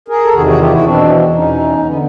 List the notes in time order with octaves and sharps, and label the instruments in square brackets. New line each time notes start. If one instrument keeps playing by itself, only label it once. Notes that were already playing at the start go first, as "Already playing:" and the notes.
[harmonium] G#4 A#4
A4
E2 C3 D#3 F#4 G#4
F#4 G#4
F4 G4
E4 F#4
E2 B2 C4 D4
E2 B2 C#4 D#4
D3 B3 C#4